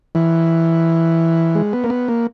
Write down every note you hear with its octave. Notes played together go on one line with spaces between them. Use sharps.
E3
G#3
B3
A#3
B3
A#3